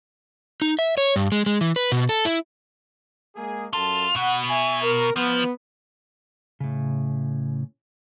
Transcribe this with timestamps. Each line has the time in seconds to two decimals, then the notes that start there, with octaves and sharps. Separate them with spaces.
0.62 D#4
0.79 E5
0.98 C#5
1.16 G2
1.32 G#3
1.46 G#3
1.61 E3
1.76 B4
1.92 B2
2.09 A4
2.25 E4
3.36 G#3 A#3 G#4
3.73 F#2 F4 A4 A5
4.16 B2 F#5
4.48 E5 G#5
4.82 A#4
5.16 F3 B3
6.60 A2 C#3